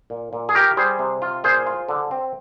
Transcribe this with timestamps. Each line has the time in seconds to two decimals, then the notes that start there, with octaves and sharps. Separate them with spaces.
0.10 A#2
0.33 A#2
0.49 G#4
0.55 F4 G4 A#4
0.77 G3 G#4 C5
0.99 C3
1.22 F4
1.44 A#2 G#4 C5
1.67 F4
1.89 D3
2.11 C4